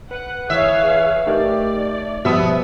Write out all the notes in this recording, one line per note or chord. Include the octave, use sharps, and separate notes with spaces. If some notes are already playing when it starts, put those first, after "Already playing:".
B4 F#5
E3 G#4 C#5 E5 F5
A3 D#4 G4 A#4 D5
B2 F3 G3 B3 E5 D#6